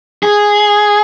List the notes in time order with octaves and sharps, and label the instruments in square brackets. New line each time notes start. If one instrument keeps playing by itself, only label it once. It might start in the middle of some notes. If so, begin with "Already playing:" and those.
[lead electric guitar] G#4